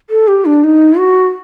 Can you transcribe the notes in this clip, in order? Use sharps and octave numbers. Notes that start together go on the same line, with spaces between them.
A4
G4
D4
D#4
F#4